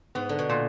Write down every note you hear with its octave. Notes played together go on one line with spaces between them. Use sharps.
G#2 B3
D3
B2
A#2